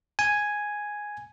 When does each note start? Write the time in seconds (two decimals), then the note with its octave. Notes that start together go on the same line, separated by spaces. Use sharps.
0.19 G#5